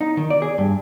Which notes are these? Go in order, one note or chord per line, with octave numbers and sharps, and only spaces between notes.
D#4
D#3
D5
G#4
G2